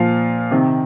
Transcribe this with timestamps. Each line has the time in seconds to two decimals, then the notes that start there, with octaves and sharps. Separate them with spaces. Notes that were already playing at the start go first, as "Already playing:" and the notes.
Already playing: A#2 F3 F5
0.51 C3 D#3